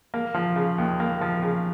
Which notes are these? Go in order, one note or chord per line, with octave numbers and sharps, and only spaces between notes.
A#3
F3
C#3
D#2
A#3
F3
C#3